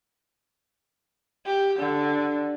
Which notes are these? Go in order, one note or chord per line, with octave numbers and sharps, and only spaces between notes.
G4
D3